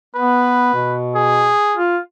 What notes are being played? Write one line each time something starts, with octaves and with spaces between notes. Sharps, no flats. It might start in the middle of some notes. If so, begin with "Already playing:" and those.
B3 B4
B2
G#4
F4